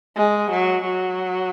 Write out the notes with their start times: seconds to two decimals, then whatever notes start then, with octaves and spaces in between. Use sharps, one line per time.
0.16 G#3
0.51 F#3
0.84 F#3